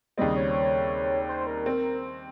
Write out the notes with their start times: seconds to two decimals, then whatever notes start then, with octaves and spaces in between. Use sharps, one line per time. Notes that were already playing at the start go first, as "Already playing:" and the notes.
0.17 D#2 C#3 G3 C4 D#5
0.36 C#5
1.28 C5
1.47 A#4
1.66 C4